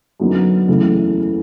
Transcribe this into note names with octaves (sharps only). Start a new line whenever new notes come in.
F#2 D3 F#3 B3 D#4
F#1 E2 C#3 E3 A3